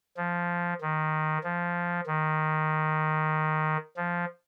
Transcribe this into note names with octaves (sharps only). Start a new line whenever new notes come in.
F3
D#3
F3
D#3
F3